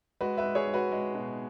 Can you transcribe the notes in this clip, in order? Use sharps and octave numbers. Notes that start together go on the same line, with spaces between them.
G#3 F#4 B4
B4 E5
G#3
G#4 C#5
G#3
F#4 B4
G#3
B2